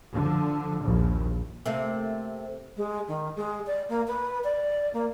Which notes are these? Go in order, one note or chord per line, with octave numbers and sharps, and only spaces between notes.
D3 F3
A#1 D#2
C3 A3 A#3
G#3
D#3
G#3
D5
A#3
B4
D5
A#3